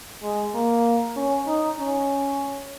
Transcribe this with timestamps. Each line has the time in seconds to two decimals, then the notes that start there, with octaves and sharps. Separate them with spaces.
0.23 G#3
0.54 A#3
1.16 C#4
1.47 D#4
1.79 C#4